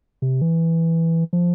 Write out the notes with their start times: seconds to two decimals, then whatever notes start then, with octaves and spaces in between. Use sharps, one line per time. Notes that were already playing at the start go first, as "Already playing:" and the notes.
0.22 C3
0.42 E3
1.33 F3